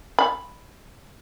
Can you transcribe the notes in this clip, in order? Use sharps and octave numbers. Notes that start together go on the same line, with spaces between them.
B5